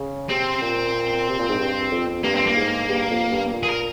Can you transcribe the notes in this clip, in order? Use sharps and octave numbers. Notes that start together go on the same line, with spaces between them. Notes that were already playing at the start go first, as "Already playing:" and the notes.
Already playing: C#3
C3 C4
A#2
C3
A#2
G#2
G2
F2
G2 A#3
C4
A#3
G#2
G2
F2
G2
A#2
G#4
A#4